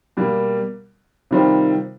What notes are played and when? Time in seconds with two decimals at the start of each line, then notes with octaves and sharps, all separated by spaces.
0.17 B2 G3 A#3
1.31 C3 D#3 G3 C4 F4